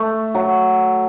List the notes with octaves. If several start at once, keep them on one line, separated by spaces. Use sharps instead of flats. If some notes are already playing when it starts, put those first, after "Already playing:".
Already playing: A3
F#3